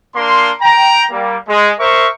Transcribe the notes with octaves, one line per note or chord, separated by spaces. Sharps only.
A#3 D4 C6
G5 A#5
G3 A#3
G#3
A#4 C5 E5 C#6